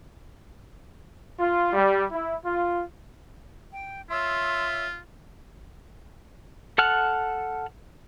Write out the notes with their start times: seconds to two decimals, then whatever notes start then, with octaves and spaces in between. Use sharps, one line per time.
1.39 F4
1.73 G3
2.12 E4
2.45 F4
3.72 G5
4.10 F4 C#5 E5 C6 E6
6.78 A4 F#5 A5 F6 F#6